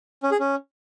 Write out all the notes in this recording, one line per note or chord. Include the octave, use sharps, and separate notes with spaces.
C#4
G#4
C#4